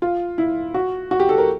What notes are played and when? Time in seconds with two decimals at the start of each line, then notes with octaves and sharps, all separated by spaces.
0.02 F4
0.38 E4
0.74 F#4
1.11 F#4
1.20 G4
1.29 A4
1.38 A#4